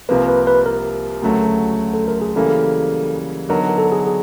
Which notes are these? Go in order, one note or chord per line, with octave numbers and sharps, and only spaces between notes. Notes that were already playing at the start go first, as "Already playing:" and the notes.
C2 C3 F3 A#3 B4
B4
B4
A#4
D2 C#3 F#3 A3
A4
A#4
G#4
C#3 E3 G3 A#3 A4
D3 F#3 B3 D#4 F#4 A#4
A#4
A4
G#4
G#4